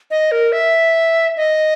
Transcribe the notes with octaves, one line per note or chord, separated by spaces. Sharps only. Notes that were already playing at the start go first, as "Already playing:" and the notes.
D#5
A#4
E5
D#5